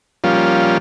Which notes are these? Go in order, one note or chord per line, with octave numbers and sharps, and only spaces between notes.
F3 G3 A#3 C#4 F4